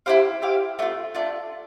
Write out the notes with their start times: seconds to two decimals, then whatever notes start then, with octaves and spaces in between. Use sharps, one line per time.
0.06 E4 G4 C5 F5
0.42 E4 G4 C5 F5
0.79 A3 D4 F4
1.15 A3 D4 F4